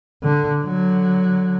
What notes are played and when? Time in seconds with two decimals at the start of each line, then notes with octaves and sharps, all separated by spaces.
0.23 D3
0.62 D3 F#3